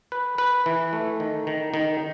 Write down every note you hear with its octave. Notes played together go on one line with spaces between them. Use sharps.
B4
B4
E3
A3
D#3
D#3
D#3